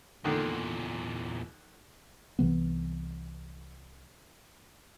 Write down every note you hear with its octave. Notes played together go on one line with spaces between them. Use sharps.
E2 A#2 D3 D#3
C2 C3 E3 B3